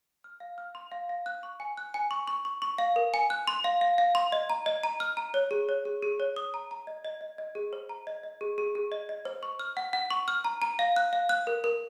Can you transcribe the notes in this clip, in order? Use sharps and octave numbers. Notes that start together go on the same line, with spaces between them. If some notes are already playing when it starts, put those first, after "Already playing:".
F6
F5
F6
C6
F5
F5
F#6
C#6
G#5
F#6
G#5
C#6
C#6
C#6
C#6
F5
A#4
G#5
F#6
C6
F5
F5
F5
C6
D#5
A#5
D#5
A#5
F6
A#5
C#5
G#4
C#5
G#4
G#4
C#5
D#6
A#5
A#5
D#5
D#5
D#5
D#5
G#4
C5
A#5
D#5
D#5
G#4
G#4
G#4
D#5
D#5
C5
C#6
F6
F#5
F#5
C#6
F6
A#5
A#5
F5
F#6
F5
F#6
A#4
A#4